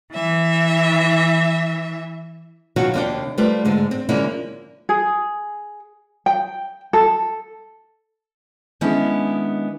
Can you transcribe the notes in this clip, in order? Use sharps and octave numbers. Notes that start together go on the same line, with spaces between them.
E3 E5
B2 D#3 F3 F#3 F#4 C#5
D#2 C3 A#3 D4 G5
G3 A3 F4 B4 C5
G#2 D3 G#3
C4
D3 F3 G#3 A#3 C#4 E4
G#4
G5
A4
D#3 G#3 B3 C#4 D4 E4